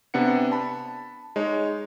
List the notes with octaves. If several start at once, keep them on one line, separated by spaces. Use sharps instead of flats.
C3 B3 D4 F#5 C#7
A5 B5
G#3 D#4 C#5